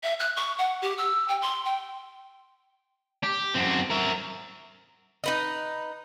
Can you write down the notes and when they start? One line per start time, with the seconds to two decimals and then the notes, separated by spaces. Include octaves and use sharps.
0.03 E5
0.19 F#6
0.36 C#6
0.58 F#5
0.82 G4
0.98 E6
1.28 G5
1.42 C6
1.65 G5
3.23 G4
3.54 F#2 C4
3.90 A#4 E5
5.24 D#4 B4 D#5